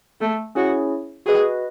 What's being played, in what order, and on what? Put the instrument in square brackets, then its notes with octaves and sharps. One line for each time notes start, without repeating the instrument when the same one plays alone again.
[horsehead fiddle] A3
[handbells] C#4 E4 G#4 C#5 [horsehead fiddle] F#4
[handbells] F#4 B4 D#5 [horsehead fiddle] G#4